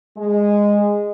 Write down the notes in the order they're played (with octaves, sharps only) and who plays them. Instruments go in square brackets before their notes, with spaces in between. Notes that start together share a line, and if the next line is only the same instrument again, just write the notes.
[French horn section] G#3